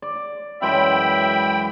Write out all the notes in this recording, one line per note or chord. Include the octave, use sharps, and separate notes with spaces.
D5
F#2 E3 G#3 E5 G5 B5